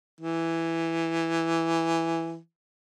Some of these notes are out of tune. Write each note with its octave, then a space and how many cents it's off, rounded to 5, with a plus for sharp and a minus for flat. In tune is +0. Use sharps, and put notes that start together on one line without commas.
E3 +5